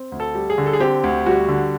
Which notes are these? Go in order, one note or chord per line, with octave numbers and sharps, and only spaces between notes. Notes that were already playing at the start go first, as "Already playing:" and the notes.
Already playing: C4
D2
A4
G3
G#4
D3
A4
G#4
C4 G4
D2
G3 F#4
D3